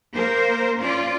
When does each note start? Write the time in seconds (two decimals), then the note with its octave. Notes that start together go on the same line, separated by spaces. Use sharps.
0.13 A#3 A#4 C5
0.81 C#4 F4 D5